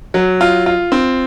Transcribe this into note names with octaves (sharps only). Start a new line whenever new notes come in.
F#3
F4
F4
C4